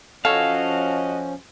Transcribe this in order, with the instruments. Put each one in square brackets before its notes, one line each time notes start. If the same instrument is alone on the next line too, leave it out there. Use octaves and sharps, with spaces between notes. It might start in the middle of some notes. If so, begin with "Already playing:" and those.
[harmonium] F3 C#4 [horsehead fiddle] F#4 D#5 [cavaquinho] A4 C#5 [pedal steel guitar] F5